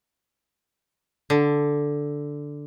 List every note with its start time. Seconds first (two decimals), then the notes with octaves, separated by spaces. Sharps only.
1.30 D3